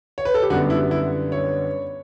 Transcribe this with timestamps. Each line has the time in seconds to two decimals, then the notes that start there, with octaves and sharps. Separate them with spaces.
0.18 C#5
0.25 B4
0.34 A4
0.42 G4
0.50 F#2 D3 G3 B3 F#4
0.70 E4
0.91 E4
1.32 C#5